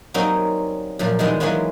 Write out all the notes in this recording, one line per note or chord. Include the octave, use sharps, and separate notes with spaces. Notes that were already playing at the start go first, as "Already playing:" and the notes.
F#3 G3 A#3 C4 C#4 D#4
F#2 A#2 F3
D#3 E3 G3 G#3 B3 C4
E3 F#3 G#3 A#3 B3 C#4